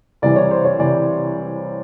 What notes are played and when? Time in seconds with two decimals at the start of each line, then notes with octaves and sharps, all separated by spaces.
0.22 C2 C3 E3 D5
0.36 C#5
0.51 C5
0.65 C#5
0.79 C3 E3 D5